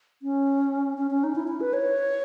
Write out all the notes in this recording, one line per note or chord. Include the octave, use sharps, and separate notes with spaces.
C#4
C#4
C#4
D#4
E4
E4
B4
C#5